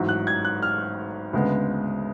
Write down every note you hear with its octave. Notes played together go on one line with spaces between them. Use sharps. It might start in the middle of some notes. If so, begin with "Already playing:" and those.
Already playing: A1 G#2 F#3
F#6
G#6
F#6
F6
D2 C#3 G#3 B3